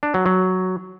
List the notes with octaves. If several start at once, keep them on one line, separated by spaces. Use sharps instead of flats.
D4
F#3
F#3